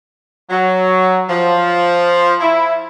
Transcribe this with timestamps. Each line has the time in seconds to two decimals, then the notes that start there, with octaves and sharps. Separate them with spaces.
0.50 F#3
1.30 F3
2.41 E4